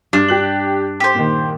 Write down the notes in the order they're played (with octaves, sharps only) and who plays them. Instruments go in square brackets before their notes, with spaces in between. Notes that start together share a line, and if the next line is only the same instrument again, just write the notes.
[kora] G2 [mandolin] D4
[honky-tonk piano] G4 F#6 F#7
[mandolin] G4 C5
[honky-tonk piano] A#2 D#3